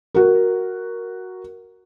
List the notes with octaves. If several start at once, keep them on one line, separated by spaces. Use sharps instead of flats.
F#4 A#4